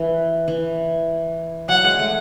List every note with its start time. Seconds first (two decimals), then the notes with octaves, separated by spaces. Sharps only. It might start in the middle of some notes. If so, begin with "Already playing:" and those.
Already playing: E3
0.48 E3
1.69 F#3 F#5
1.84 G#3
1.99 A3